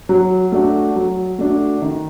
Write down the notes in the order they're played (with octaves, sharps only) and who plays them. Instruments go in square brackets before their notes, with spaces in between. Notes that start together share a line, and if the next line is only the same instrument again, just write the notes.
[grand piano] F#3
A3 D4 F#4
F#3
A3 D4 F#4
D#3